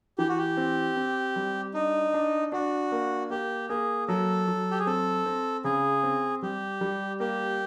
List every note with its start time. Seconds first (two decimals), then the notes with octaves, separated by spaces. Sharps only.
0.18 E3 G4
0.29 F#4
0.38 G4
0.57 C4
0.97 C4
1.36 G3
1.74 D4 D#4
2.14 D4
2.52 D4 F#4
2.92 A#3
3.30 A#3 G4
3.69 A#3 G#4
4.08 F#3 A4
4.47 F#3
4.71 G4
4.79 G#4
4.86 C4 A4
5.26 C4
5.64 C#3 G#4
6.03 C4
6.42 G3 G4
6.81 G3
7.20 A#3 G4